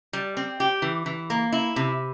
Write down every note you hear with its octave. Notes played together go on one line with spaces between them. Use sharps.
G3
C4
G4
E3
E3
A#3
E4
C3